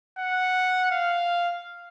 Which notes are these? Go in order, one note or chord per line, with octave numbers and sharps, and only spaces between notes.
F#5
F5